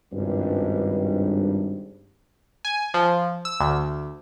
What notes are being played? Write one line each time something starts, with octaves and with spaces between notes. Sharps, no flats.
G#1 C#2 G2
G#5
F3
E6
D2